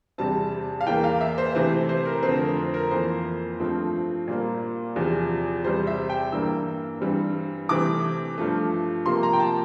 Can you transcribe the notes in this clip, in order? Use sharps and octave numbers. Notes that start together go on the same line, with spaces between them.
E2 C3 G3 C4 A5
F5
E2 E3 A#3 G5
F5
E5
C5
C3 E3 A3 C5
C5
A#4
F2 D3 A3 C4 C5
A#4
C5
A#4
F2 E3 A#3 C5
G2 F3 A3 C4
A#2 G3 A#3
E2 C3 F3
E2 C3 G3 C5
E5
G5
G2 E3 G3 A#3 E6
G2 E3 G3 C4
C3 E3 A3 C4 D6
G2 F3 A3
C3 F3 A#3 C6
A#5
G5
A5